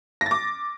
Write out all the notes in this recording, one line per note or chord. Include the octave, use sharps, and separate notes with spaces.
D6 A6 A#6